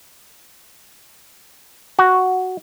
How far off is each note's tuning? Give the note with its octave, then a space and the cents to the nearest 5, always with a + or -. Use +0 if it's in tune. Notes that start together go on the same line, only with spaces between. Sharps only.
F#4 +5